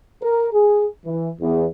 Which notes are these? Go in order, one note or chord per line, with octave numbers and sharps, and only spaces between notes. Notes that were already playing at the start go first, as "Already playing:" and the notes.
A#4
G#4
E3
E2